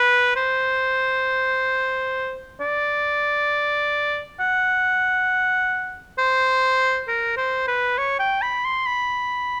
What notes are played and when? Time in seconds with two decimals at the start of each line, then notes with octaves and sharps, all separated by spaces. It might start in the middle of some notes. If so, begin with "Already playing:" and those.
Already playing: B4
0.36 C5
2.61 D5
4.40 F#5
6.18 C5
7.08 A#4
7.37 C5
7.68 B4
7.98 C#5
8.19 G5
8.42 B5
8.65 C6
8.86 B5